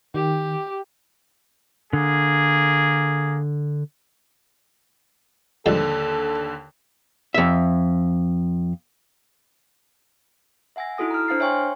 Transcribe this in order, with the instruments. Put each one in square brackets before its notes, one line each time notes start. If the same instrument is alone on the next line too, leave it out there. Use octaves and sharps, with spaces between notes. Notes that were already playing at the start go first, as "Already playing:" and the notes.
[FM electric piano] D#3 [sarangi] G4
[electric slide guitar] D3 [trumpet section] A#3 G#4
[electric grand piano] D#2 D3 [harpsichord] G#2 F3 G3 [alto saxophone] A4
[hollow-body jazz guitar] F2 E5
[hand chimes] E5 F#5 G#5 E6 A#6
D#4 E4 F#4 A4 D#6 A#6
A#5 F6
D4 C5 F5 F6 A6 C7
C#5 E5 G5 G#5 C6 C#6